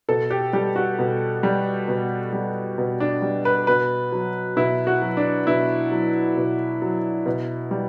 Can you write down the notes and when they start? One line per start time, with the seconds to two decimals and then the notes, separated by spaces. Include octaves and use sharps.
0.09 B2 A4
0.30 G4
0.53 G3 G4
0.76 F#4
0.99 B2
1.43 G3
1.88 B2
2.33 G3
2.78 B2
3.00 D4
3.22 G3
3.45 B4
3.67 B2 B4
4.12 F#3
4.56 B2 E4
4.87 F#4
5.02 F#3
5.17 D4
5.47 B2 E4
5.91 F#3
6.37 B2
6.82 F#3
7.26 B2
7.71 G3